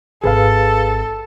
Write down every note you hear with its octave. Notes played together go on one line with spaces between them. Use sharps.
G#1 G#4 A4 B4 F5